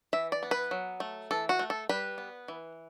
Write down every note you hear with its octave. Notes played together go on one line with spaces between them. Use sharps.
E3 E5
D5
B3
B4
F#3
A3
E3 A4
F#4
A3
A4
G3 B4
B3
E3